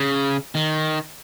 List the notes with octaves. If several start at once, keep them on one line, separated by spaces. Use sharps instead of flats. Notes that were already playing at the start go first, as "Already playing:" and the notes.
Already playing: C#3
D#3